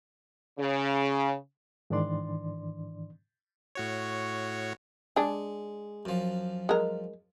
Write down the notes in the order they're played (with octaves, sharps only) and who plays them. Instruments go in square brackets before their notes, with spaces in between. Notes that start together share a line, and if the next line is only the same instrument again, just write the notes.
[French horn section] C#3
[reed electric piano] G#2 D#3 E3 D4 D5 C6
[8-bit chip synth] A2 F#4 C#5
[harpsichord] G#3 [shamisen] D4 G#4
[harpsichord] F#2 F3
[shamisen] G#3 A#4